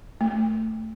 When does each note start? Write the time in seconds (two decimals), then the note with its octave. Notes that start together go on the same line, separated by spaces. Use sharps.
0.21 A3